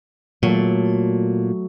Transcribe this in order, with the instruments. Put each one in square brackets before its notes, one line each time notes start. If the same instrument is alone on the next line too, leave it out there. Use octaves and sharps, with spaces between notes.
[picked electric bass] A#2 [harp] F#3 A3